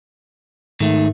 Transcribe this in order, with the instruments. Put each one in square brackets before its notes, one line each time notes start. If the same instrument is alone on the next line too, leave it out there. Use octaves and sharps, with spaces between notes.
[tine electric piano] G#2 [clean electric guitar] D#3 A3